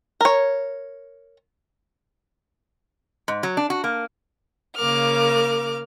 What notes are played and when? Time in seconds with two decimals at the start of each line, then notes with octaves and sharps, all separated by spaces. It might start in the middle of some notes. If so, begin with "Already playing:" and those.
0.21 A#4 C#5
3.28 G#2
3.43 F#3
3.57 D4
3.70 F#4
3.84 A#3
4.76 C#3 A#3 A#4 D6 F6